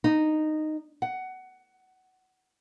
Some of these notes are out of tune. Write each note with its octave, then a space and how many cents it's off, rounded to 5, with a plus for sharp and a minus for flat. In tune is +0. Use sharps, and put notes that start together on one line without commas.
D#4 -10
F#5 +15